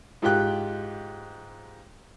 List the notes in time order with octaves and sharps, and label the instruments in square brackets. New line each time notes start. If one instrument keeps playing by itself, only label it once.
[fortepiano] G#2 F4 G4 G5 F#6